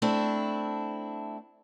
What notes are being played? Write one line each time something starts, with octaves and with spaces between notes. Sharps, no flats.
A3 C4 D4 E4